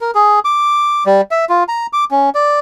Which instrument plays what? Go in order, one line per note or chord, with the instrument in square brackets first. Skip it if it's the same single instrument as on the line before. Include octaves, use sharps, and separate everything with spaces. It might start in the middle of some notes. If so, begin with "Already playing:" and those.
[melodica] A#4
G#4
D6
G3
E5
F4
A#5
D6
C#4
D5